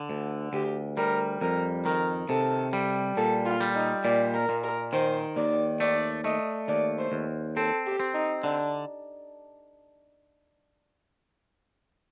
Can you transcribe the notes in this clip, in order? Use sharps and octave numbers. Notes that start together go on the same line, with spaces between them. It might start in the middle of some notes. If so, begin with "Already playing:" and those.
Already playing: D3
D2
D2 G4
G3 A#4
F2 A#4
D#3 A#4
C3 A4
G3
A#2 A4
F4
G3
D#4
A#2 D5
A#4
A#2
A#4
D#3 C5
D#2 D5
A3 D5
A3 D#5
D#2 D5
C5
D#2
C4 A4
G4
C4
D#4
D3 D4